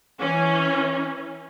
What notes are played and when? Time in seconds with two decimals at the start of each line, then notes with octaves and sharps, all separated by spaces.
0.21 E3 C#4